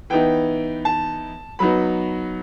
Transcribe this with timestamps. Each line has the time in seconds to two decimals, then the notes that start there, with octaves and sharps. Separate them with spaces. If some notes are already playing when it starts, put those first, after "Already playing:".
0.10 E3 B3 D#4 G5
0.85 A5
1.59 F#3 B3 D#4 B5